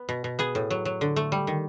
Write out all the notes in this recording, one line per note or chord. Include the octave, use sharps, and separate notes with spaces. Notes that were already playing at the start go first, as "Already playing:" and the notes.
Already playing: B3
B2
B2
B3 G#4
A2
F#3
F#3
D3
A3
G3
D#3